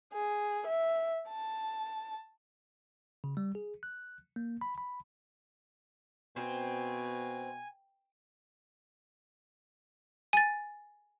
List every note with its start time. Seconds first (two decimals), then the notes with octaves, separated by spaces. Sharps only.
0.13 G#4
0.67 E5
1.29 A5
3.24 C#3
3.37 G3
3.55 G#4
3.83 F#6
4.36 A#3
4.61 B5
4.78 B5
6.36 B2 C4 G#5
10.33 G#5 A6